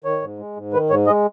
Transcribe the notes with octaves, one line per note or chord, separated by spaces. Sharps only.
D#3 C#5
G#2
G#3
G#2
D#3 B4
G#2 C#5
G#3 D#5